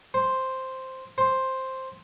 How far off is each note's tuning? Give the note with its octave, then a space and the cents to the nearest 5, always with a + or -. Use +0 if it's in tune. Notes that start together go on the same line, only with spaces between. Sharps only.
C5 +0
C5 +5